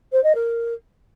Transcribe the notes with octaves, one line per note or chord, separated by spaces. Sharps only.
C5
D#5
A#4